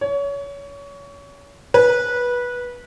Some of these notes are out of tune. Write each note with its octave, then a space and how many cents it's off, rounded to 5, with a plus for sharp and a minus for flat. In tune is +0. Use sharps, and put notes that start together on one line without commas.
C#5 +30
B4 -20